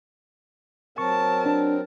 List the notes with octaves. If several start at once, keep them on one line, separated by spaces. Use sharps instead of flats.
F#3 C4 A#4 A5 C#6
D4